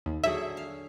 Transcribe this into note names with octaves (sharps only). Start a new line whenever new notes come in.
D#2
D3 F#3 G#4 E5
F5